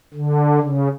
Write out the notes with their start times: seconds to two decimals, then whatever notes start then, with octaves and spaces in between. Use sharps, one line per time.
0.14 D3
0.61 C#3